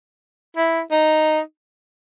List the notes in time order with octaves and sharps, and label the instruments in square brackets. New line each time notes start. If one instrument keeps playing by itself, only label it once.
[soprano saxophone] E4
D#4